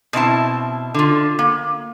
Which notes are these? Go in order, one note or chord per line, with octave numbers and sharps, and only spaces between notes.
B2 C4 E4 A5
D3 F4
A#3